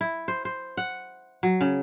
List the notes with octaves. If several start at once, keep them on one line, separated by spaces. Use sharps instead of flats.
E4
C5
C5
F#5
F#3
C#3